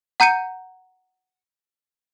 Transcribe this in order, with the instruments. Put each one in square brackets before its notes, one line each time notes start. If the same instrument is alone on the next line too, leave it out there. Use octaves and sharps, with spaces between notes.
[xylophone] F#5 A#5 G6 C#7 D#7